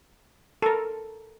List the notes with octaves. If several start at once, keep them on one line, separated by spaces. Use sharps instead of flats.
A4 A#4